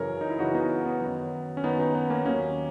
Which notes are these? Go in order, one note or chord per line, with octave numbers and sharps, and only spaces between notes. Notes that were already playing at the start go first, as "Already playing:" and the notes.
Already playing: F#2 C#3 E3 A#4 C#5
D#4
E4
F#2 C#3 E3 D#4 F#4
B3 D#4
B3
F#2 D#3 F#3
C#4
F#2 D#3 F#3 B3 D#4
B3 D#4
B3
A#3 C#4
D#2 D#3 F#3 A#3 C#4